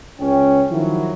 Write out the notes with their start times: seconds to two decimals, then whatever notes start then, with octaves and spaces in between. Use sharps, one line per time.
0.20 C#2 C#4 G5
0.71 D#3 F3 F#3 E4